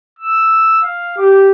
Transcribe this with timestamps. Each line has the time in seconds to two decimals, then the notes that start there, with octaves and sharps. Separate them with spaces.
0.19 E6
0.83 F5
1.18 G4 D6